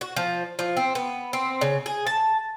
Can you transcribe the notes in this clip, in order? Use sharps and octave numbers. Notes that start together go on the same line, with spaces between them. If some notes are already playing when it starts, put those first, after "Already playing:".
F#4
F3
F3
C4
B3
C4
C#3
G#4
A5